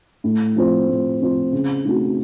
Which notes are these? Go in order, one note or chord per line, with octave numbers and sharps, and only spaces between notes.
A2
F3 C4 F4 C5
A2
F3 C4 F4 C5
C#3
A3 C4 D#4 F#4